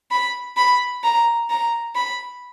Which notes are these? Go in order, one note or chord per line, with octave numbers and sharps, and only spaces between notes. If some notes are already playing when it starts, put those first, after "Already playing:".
B5
B5
A#5
A#5
B5